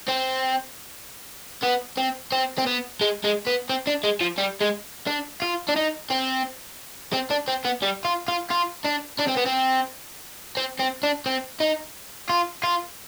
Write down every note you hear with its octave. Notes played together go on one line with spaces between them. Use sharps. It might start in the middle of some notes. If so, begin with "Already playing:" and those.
C4
B3
C4
C4
C4
B3
G#3
G#3
B3
C4
D4
G#3
F3
G3
G#3
D4
F4
D4
D#4
C4
C4
D4
C4
B3
G3
F4
F4
F4
D4
D4
C4
B3
C4
C4
C4
D4
C4
D#4
F4
F4